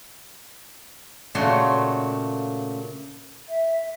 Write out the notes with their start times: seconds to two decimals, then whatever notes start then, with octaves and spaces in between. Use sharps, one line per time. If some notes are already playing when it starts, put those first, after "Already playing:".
1.35 A#2 C#3 A3 F4 F#4 C6
3.49 E5